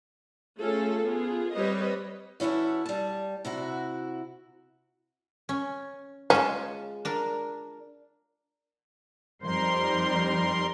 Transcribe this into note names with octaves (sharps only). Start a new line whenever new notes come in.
A3 C#4 F4 G#4 A4
B3 F4 G#4
G3 C4 B4 C#5 D#5
E3 C#4 E4 F#4 A4
G3 A5
C3 E4 F#4
C#4
G#3 C#4 F4 A5
D4 A#4
F2 G3 D#4 A#4 C5 C6